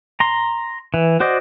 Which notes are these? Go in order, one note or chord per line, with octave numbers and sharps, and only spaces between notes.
A#5 C6
E3
F#4 C5 D5 D#5